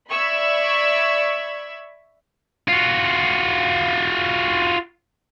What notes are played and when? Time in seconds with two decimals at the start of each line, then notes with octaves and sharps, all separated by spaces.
0.11 D5 E5 B5 C#6 E6 G#6
2.68 F4 F#4